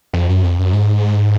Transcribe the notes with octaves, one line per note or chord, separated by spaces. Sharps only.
F2
F#2
F2
F#2
G#2